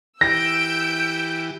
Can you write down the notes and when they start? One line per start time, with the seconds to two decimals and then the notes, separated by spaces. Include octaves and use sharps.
0.21 E3 G4 E6 G6 A#6 D7